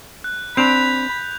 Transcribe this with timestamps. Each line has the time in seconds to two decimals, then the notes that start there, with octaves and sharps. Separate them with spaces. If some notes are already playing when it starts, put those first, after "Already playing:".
0.24 F#6
0.57 C4 D4 B5 G6 F7